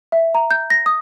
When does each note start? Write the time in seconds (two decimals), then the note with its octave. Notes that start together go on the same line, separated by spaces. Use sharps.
0.12 E5
0.35 A#5
0.51 G6
0.70 A#6
0.86 D#6